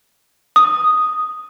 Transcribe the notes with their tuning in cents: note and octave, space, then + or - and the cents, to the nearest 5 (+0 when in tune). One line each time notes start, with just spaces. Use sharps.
D#6 +0